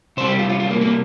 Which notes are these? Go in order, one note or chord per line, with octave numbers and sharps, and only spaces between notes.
C3 G3 C5
G4
F4
F4
F4
A#3
A#3